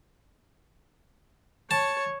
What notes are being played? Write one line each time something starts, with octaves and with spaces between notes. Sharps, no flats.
C#5 A5